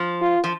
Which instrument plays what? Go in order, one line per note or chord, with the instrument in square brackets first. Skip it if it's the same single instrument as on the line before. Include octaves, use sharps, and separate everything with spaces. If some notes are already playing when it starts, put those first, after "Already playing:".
Already playing: [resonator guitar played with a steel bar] F3
[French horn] F4
[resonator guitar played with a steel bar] F3